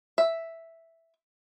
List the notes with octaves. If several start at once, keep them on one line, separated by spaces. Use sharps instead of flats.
E5